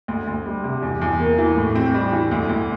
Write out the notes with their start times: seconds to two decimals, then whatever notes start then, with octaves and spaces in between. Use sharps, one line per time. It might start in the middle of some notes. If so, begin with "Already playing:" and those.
0.08 D2
0.27 D2
0.46 G3
0.64 C3
0.82 E2
1.01 E2
1.20 A#3
1.38 E3
1.57 A2
1.75 C4
1.94 G3
2.12 E3
2.31 D2
2.49 D2